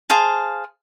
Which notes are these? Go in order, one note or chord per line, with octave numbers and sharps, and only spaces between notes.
G#4 C5 F5 A5